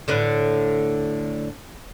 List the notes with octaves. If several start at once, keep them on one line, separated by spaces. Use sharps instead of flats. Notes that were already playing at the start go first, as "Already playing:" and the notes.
A2 D3 B4